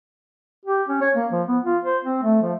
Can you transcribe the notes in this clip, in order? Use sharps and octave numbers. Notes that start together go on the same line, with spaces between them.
G4
C#4
C#5
A#3
F3
B3
F4
C5
C4
A3
F3